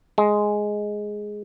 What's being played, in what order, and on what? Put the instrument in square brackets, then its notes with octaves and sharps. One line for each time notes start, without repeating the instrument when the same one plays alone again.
[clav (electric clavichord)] G#3